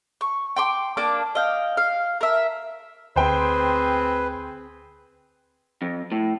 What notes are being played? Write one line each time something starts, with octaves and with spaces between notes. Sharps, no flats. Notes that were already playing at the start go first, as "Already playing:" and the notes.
C#6
G5 C6 D6
A#3 D4 D6
D#5 F5 G5
F5
A#4 E5
D2 C4 G#4 B4 C5 G5
F2
A2